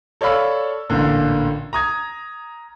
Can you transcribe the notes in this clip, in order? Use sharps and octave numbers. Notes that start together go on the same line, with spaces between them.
A4 C#5 D5 F5 B5 E6
A1 A#2 D3
A#5 D#6 G#6